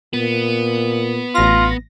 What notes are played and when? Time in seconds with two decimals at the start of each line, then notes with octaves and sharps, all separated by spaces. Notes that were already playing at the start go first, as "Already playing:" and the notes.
0.13 A#2 B3
1.35 A1 F4 A#6